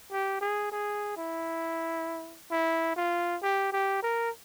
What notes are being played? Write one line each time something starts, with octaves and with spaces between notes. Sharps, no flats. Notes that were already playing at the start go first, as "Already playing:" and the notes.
G4
G#4
G#4
E4
E4
F4
G4
G4
A#4